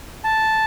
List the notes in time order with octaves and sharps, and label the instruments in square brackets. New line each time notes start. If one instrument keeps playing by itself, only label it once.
[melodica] A5